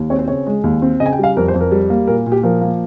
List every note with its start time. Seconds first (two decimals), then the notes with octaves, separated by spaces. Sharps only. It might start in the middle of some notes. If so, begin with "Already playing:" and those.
Already playing: D#2
0.10 C4 C#5
0.19 C5
0.28 C#3 C#5
0.47 G#3
0.64 D#2
0.82 C4
1.00 C#3 D#5
1.06 G#5
1.12 G5
1.19 G3
1.24 F5
1.37 F2 A#4
1.48 C5
1.54 F2
1.61 A#4
1.71 G3
1.90 A#3
2.07 A#2 A#4
2.27 A#2
2.32 G4
2.43 F3 A#4
2.61 A#3